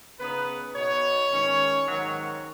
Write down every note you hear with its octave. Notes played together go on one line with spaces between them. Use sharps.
C#3 B3 D#4 B4
B2 B3 D#4 C#5
G#2 D#3 G#3 C#4
G#2 D#3 F#3